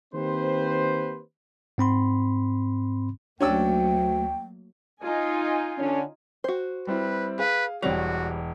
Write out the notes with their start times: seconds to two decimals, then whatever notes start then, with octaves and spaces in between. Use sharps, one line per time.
0.14 D#3 A#3 C4 G4 B4 C5
1.78 G#2 C4 B5 C6
3.40 D2 F#3 A3 A#3 C#4 D4 G5 E6
5.03 D#4 F4 G#5
5.78 D3 C#4
6.44 F#4 C5
6.87 G3 C4 E4 B4
7.39 G#4 B4 F5
7.82 E1 G3 C4 F#4 C#5 F7